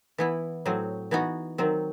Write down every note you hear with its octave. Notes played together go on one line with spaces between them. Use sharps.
E3 B3 E4
A2 F#3 C4
E3 B3 D#4 F#4
D#3 F#3 C4